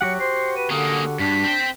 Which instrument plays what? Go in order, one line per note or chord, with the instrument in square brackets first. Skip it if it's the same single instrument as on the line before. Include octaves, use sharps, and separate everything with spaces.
[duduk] F#3 [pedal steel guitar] F#4 G4 F#5 [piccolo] C#7
[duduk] C5 [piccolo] C7
[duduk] B4 [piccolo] D#7
[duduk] D3 [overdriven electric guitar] A#3 C#4 [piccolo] D#6
[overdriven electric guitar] G2 [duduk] D4 [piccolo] B6
[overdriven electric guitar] C4 G5